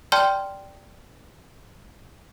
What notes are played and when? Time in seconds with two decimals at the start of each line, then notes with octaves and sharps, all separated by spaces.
0.12 D5 G5 A5 C6 F6 G6